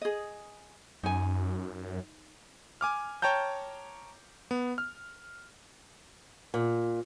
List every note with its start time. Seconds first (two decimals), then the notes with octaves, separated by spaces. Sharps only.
0.01 G#4 D#5
1.03 F#2 D#4 G#5
2.81 G#5 D6 F6
3.22 C#5 G5 A5 A#5 G6
4.51 B3
4.78 F6
6.54 A#2